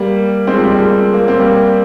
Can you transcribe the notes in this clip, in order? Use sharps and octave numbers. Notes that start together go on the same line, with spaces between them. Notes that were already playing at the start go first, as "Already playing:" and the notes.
Already playing: G3 A#3
G#3 C4
F3
G3
G#3
G3 A#3
A#3
C4
G3 A#3